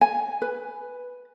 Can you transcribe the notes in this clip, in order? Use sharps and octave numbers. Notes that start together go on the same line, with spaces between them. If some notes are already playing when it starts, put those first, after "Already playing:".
G#5
B4